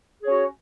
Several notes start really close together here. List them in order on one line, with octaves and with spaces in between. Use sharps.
G#4 C#5 C#4 F#4